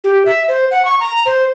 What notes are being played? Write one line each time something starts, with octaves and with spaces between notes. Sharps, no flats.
G4
E5
C5
F#5
C#6
A#5
C5